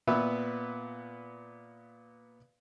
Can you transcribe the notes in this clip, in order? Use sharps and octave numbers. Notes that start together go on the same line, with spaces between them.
A#2 B3 B4 E5